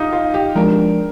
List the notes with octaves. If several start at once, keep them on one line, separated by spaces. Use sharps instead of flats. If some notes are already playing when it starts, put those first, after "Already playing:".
Already playing: D#4 F4 G4
F4
G4
F3 G#3 D4 A#4